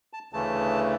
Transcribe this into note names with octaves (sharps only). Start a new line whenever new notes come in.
A5
D2 C#3 E3 A3 A5